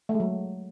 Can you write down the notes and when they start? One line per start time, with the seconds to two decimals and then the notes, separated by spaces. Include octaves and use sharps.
0.09 A3
0.14 G#3
0.20 F#3